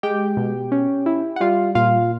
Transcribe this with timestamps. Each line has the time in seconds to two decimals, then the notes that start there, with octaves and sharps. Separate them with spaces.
0.03 G#3 G4 G5
0.37 B2
0.72 C#4
1.06 E4
1.36 F#5
1.40 G3 F4 F5
1.75 A#2 F4 F5